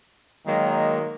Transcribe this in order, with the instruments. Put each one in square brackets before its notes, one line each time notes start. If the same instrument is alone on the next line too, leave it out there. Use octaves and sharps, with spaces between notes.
[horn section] D#3 F#3 [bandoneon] G#3 A#3